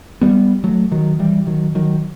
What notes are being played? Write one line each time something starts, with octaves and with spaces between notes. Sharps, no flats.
G3 B3
F#3 A3
D#3 F#3
E3 G3
D#3 F#3
D#3 F#3